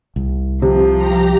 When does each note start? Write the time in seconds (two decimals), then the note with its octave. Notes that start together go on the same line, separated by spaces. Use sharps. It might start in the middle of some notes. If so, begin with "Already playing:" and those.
0.16 C2
0.62 C3 F3
0.97 G4 A#5